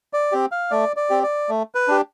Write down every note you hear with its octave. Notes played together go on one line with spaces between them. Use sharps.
D5
C4 G4
F5
A3 D5
D5
C4 G4
D5
A3
B4
D4 G4